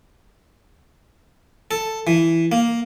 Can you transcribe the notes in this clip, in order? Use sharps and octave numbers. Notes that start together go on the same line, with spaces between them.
A4
E3
A#3